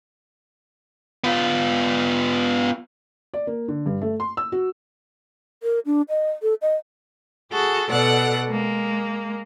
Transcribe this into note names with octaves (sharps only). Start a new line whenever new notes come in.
B3 F4
D5
A#3
D3
G2
A3
C6
E6
F#4
A#4
D4
D#5
A4
D#5
F#4 G#4 A4
B2 A4 D5 F#5 F#6
G#3 A#3